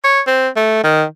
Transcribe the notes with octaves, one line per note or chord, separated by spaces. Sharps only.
C#5
C4
A3
D#3